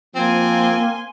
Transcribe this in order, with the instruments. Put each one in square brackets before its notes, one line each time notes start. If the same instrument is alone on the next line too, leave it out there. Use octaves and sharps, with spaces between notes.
[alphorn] F3 [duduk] A#3 [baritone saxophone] C4 [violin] G#5 C6